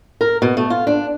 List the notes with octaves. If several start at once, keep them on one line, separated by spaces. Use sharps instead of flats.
A#4
B2
A3
F4
D4